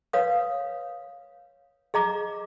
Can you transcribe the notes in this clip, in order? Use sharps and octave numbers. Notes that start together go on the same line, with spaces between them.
B4 C#5 F5 D#6
G#4 D#5 A#5 D6